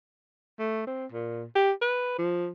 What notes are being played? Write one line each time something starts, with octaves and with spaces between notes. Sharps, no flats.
A3
C4
A#2
G4
B4
F3